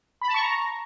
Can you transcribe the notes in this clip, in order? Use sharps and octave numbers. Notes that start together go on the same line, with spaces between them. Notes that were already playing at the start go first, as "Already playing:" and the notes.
B5
A5
C#6
A#5